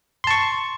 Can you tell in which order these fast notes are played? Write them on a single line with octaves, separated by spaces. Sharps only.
C6 A5 C#6